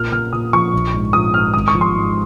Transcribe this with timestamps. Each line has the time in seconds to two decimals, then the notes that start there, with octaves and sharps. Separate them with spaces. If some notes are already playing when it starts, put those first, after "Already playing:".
Already playing: A#2 F4 F6
0.12 A#2 F6
0.33 A#2 D#6
0.53 F3 C#6
0.73 A#1
0.93 G#2
1.13 A#1 D#6
1.33 G#2 F6
1.54 G#1 D#6
1.68 C#6
1.74 F3
1.81 C6
1.95 G#2